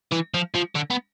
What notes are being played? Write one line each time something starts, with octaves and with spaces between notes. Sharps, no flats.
E3
F3
F3
D3
B3